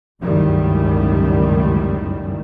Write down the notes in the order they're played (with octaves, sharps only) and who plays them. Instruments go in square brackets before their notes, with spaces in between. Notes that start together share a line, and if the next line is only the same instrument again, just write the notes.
[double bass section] G1 C#2 F#2 A2 D#3 G3